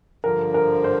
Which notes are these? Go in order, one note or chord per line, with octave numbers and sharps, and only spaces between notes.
G2 D3 F3 A#4
A#4
C5